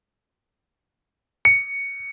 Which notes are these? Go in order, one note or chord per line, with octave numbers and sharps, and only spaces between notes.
C#7